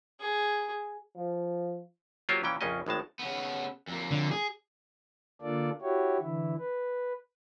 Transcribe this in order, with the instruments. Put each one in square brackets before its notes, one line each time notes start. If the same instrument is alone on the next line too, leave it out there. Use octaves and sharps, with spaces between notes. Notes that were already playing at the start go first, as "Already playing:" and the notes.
[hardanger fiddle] G#4
[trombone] F3
[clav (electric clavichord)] F#3 A#3 F4 G4 C5 C#5
A#2 E3 C#4 G5
A#1 F2 C#3 C#4 D#5
G#1 A2 G#3 A5
[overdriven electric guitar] C#3 B3
F2 A#3
[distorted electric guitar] D3
G#4
[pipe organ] D3 A#3 D4 F4 A4 D5
E4 F#4 G4 C#5
D3 E3 E4
B4